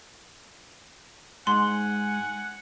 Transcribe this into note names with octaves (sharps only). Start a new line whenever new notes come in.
G#2 F#5 G#5 C6